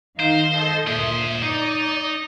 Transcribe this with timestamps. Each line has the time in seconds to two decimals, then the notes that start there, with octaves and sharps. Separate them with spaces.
0.20 D#3 D#4 C5 F5
0.55 A4 D#5
0.87 D2 A#2 C5 D#5 E5
1.42 D#4 D5